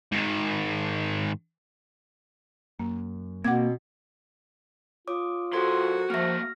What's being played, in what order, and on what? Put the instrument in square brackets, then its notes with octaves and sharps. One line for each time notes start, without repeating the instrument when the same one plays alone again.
[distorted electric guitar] G#2 D#3
[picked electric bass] F#2 [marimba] A#3
[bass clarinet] B2 [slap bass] A#3 [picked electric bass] C4 [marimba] F#5 D6 G#6
[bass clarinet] F4 [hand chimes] C#5 D6 D#6
[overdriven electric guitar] F#2 C6 [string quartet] F#4 [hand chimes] A4 C5 G#6
[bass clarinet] F3 [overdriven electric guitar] A#3 E5 [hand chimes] F6 A#6